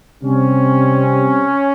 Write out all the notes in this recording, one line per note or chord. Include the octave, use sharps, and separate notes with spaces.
C3 G3 C4 C#4